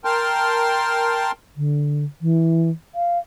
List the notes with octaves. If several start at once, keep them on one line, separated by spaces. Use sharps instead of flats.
A#4 G5 A5 C6 F6
D3
E3
F5